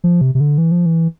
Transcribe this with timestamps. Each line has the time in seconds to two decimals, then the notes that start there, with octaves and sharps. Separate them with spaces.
0.04 F3
0.21 C3
0.35 C3
0.40 D3
0.58 E3
0.71 F3
0.86 E3